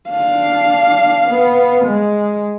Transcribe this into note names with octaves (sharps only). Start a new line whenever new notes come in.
D4 F5
B3
G#3